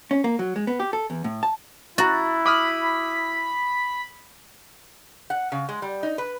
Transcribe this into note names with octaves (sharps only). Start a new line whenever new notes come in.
C#4
A#3
F#3
G#3
B3
G4
A4
E2
A2
A5
E4 F#4 A#5 F#6 A6
B5 D6 D#6 F6
F#5
C#3
G#3
G3
D#4
B4